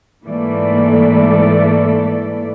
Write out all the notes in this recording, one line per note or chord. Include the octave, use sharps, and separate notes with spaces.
G#2 E3 A3 A#3 A4 D5